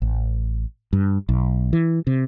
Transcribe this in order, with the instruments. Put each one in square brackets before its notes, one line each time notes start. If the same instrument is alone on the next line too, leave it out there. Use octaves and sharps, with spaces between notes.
[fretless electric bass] A1
G2
B1
E3
C3